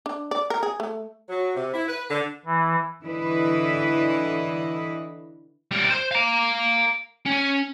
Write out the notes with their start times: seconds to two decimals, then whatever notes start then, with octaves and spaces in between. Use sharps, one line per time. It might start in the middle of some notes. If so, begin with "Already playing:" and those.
0.06 D4
0.31 D5
0.50 A#4
0.63 G#4
0.80 A3
1.29 F#3
1.55 C3
1.73 E4
1.87 B4
2.09 D3
2.45 E3
3.03 D3 E3 E4 B4 D#5
5.71 G3 A#4
5.90 C5
6.11 F5 A#5
7.26 C#4